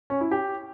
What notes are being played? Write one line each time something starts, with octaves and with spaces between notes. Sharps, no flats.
C#4
E4
G4